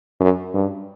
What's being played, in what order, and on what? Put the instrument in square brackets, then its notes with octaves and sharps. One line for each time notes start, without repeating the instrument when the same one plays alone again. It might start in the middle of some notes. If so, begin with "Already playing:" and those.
[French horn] F#2
G2